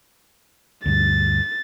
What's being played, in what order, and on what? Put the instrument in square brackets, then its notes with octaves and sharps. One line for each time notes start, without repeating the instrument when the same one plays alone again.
[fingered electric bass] D2 G2 [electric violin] A6